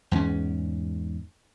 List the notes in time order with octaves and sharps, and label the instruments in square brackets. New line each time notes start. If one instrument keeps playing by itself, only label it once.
[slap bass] E2 G#2 A3 C#4